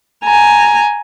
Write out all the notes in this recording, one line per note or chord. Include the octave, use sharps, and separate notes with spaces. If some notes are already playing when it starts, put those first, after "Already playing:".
G#5 A#5